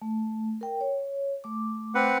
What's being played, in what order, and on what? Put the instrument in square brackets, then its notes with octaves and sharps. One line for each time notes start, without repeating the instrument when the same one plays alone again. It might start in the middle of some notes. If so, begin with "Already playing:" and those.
[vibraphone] A3
A#4 G5
C#5
A3 D6
[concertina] C4 B4 F#5